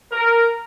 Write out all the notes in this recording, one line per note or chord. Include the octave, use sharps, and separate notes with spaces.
A#4